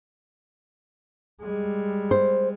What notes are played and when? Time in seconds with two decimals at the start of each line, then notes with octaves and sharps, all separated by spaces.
1.43 G3 G#3
2.11 C5